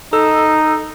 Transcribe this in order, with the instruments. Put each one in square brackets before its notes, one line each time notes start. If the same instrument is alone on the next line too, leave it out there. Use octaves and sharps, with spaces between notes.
[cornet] D#4 [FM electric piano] A4 E6